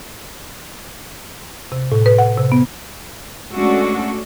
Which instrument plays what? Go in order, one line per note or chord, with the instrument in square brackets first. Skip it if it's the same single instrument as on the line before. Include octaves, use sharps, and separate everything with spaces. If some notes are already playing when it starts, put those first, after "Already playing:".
[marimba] C3
A2
B4
F#5
C3
B3
[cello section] G#3 A3 C#4 D4 F#4 A4